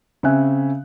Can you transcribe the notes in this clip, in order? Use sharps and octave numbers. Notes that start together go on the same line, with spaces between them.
C#3 C4 E5 G#5 F#6